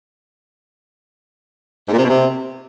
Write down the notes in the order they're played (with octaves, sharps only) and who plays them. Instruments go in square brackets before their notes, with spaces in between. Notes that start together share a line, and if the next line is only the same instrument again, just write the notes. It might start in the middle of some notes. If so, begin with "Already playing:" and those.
[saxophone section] G#2
A#2
C3
B2
C3